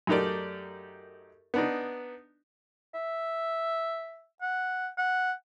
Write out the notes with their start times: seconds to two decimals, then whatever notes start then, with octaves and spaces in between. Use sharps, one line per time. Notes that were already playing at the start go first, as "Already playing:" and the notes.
0.07 F#2 A3 D#4 G4 A#4 D5
1.54 B3 D4 D#4
2.95 E5
4.42 F#5
4.98 F#5